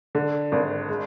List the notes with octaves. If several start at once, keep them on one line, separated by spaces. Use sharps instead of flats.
D3
G#1
G#3